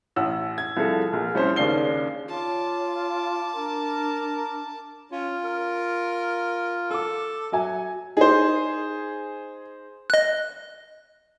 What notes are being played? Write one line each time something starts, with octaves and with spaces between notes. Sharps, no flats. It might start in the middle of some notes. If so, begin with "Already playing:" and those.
A1 F#5 E6
G#6
C2 F3 G#4 A4
A#1
C2 C#4 C5
D#2 C#3 D4 C7 G7
F4 C#5 A5 D6
D4 A#4
C#4 F4
A#4
A4 D6 E6
F#3 F#4 E5 G#5
D#4 G#4 C5
D#5 F#6